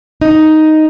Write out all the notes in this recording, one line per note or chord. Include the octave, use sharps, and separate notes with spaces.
D#4